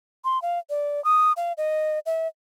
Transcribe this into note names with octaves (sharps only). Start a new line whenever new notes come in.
C6
F5
D5
D#6
F5
D#5
E5